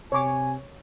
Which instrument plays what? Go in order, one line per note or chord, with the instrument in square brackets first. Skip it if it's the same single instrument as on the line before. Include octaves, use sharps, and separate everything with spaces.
[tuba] C3 [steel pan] C#5 D6 [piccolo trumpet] G#5